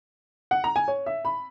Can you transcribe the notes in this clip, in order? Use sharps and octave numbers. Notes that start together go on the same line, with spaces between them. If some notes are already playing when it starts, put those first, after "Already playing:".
F#5
A#5
G#5
C#5
E5
B5